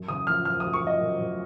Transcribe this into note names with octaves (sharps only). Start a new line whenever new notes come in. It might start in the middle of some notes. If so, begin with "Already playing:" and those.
Already playing: F#2
C#3 D#6
F3 F6
F3 F6
D#6
F#2
C#6
F3 D#5
F#2
F#2